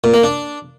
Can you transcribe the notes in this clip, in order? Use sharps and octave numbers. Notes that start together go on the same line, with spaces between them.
A#2
A#3
D4